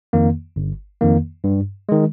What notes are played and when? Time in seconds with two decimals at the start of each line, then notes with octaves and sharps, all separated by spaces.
0.13 F2 D#3 A#3
0.56 G1
1.01 F2 D#3 A#3
1.44 G2
1.89 D#3 G#3